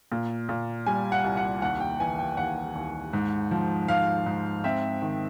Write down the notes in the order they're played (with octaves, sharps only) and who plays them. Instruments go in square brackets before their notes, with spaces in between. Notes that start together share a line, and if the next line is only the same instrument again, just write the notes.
[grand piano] A#2
A#2
G3 G#5
F#5
C2
F#5
D#2 F#5
G5
E3 G#5
G5
D#2 F#5
D#2
G#2
F3
G#2 F5
G#2
C4 E5
D#3